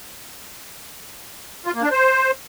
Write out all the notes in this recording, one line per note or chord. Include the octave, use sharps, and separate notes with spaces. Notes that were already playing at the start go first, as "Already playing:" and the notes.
F4
A#3
D4
C5